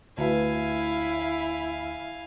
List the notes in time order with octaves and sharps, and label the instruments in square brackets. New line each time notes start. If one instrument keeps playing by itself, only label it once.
[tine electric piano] D2 [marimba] A3 F#4 B4 [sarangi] E4 [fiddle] F5 G#5